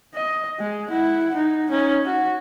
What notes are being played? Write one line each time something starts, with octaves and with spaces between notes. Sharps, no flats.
D#5
G#3
E4 F#5
D#4
C#4 D#4
F#4